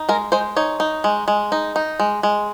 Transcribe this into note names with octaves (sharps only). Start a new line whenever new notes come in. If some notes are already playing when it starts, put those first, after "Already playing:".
Already playing: D#4
G#3 A#4
G#3 C5
D#4 C#5
D#4
G#3
G#3
D#4
D#4
G#3
G#3